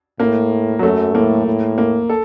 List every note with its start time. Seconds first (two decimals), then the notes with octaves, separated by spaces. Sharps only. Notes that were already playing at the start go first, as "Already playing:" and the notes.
0.19 A2 A#3
0.79 F#3
0.83 F#2 A3
1.15 A2 A#3
1.46 A2
1.78 A#3
2.09 A4